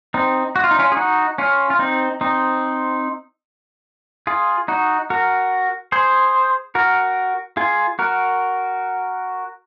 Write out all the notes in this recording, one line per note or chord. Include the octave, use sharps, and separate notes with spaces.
C4 D#4
F#4
F4
D#4
C#4 F4
G#4
D#4 F#4
C#4 F4
F4
C4 D#4
C4 D#4
F4 G#4
D#4 F#4
F#4 A#4
G#4 C5
F#4 A#4
F4 G#4
F#4 A#4